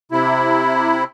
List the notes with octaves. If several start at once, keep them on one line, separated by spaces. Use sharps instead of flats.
C3 E4